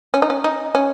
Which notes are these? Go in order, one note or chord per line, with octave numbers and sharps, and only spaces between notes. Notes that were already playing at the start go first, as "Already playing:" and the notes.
C#4
D#4
C#4
D#4
C#4